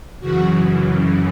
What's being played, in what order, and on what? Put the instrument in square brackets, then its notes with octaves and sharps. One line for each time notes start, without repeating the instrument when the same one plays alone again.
[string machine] F#2 C#3 E3 F#4